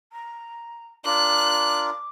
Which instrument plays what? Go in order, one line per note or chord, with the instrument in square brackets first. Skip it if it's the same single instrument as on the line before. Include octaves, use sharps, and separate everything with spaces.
[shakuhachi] A#5
[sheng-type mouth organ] D4 F4 A#4 [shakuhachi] D6 [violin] F#6